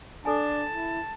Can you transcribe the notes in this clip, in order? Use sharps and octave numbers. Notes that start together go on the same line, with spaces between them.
D4 A4 G#5 A5
E4